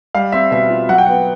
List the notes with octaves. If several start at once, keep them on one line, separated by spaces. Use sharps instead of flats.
G3 F5
C4 E5
B2 E5
F4
F#3 F#5
G5
B3 F#5